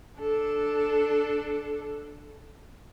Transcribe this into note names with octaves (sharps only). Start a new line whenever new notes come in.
D4 A4